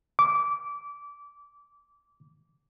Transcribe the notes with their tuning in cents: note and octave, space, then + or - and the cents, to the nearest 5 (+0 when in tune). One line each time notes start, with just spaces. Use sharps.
D6 -20